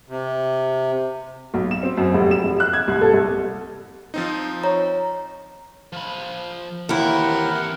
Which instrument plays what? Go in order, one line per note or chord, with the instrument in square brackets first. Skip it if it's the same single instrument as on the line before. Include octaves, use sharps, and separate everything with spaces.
[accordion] C3
[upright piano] B1
E7
C4
F#2
F1
E7
F1
F#6
G#6
C2
A4
C2
[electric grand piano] F3 C4 D#4
[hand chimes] C#5 A#5
[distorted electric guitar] F3 B5
[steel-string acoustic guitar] D#2 E4 [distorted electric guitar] E3 C4 [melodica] A#4 F#5